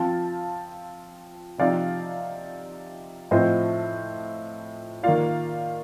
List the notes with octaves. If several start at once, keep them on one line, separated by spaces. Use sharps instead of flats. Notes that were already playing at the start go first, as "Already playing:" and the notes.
Already playing: F3 C4 F4 F5 A5
C3 F3 C4 D#4 D5 F5
A2 F3 C4 F4 C5 D#5
D#3 A#3 F4 D5 F5